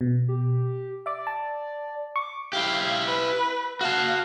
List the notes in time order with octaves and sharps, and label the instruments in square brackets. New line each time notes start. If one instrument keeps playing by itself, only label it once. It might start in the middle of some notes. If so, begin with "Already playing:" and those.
[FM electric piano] B2
[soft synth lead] G4
[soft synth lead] D5 [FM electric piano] E5 D6
[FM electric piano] A5
[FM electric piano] C#6 [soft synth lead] D6
[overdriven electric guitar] E4 G4 [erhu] F5
[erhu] B4
[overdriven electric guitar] F#4 A5 [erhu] F5